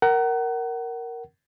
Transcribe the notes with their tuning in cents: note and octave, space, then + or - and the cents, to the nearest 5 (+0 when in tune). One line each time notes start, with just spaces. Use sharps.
A#4 +0 F#5 +30